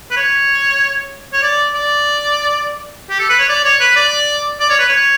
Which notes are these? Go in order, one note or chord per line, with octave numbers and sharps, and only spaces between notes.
B4
C#5
C#5
D5
D5
G4
A4
B4
C#5
D5
C#5
B4
D5
D5
C#5
B4
C#5